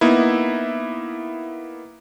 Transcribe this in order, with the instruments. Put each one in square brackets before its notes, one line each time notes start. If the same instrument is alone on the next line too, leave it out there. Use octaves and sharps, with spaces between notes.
[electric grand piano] A#3 B3 D#4 E4